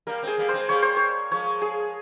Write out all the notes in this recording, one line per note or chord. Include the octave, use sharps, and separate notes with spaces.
G3 A#3 A#4
G#3 C4 G#4
G3 A#3
G#3 C4 C5
G3 A#3 C#5
C5
C#5
F3 G#3 C#5
G#4